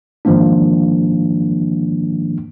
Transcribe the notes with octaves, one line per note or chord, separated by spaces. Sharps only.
G#2 D#3 F3 G#3 A#3 D4